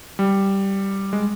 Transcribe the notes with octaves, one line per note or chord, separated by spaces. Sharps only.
G3
G#3